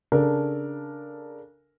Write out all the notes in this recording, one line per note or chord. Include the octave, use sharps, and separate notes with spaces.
C#3 D4 A4 A#4